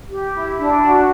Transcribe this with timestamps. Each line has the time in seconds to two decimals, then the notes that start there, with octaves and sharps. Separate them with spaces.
0.09 G4
0.33 E4
0.57 D4
0.81 F#4